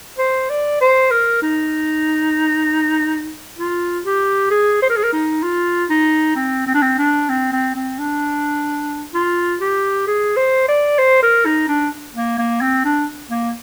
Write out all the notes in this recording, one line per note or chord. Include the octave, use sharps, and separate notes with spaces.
C5
D5
C5
A#4
D#4
F4
G4
G#4
C5
A#4
G#4
A#4
D#4
F4
D#4
C4
C4
D4
C4
D4
C4
C4
C4
D4
F4
G4
G#4
C5
D5
C5
A#4
D#4
D4
A#3
A#3
C4
D4
A#3